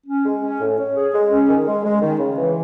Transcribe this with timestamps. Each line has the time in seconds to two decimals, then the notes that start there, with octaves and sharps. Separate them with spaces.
0.07 C#4
0.24 G#3
0.42 C#4
0.59 A2
0.78 C#4
0.96 G#4
1.13 G#3
1.30 C#4
1.48 D#3
1.66 G#3
1.84 G#3
2.01 D#3
2.19 C#3
2.37 E3